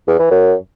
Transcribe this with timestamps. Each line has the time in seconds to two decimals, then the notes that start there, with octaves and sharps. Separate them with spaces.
0.08 E2
0.19 E3
0.31 F#2